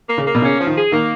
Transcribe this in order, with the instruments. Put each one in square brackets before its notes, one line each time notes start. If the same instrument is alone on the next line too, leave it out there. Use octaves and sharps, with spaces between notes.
[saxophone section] A#3
[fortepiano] C#3
[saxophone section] A#3
[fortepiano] B2
[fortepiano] C#3 [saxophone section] C#4
[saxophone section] F3
[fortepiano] D#3
[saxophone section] G#4
[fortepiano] D#3 [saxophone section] A#3